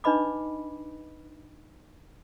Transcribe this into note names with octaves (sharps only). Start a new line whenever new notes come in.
D4 D#4 B4 D#5 B5 D6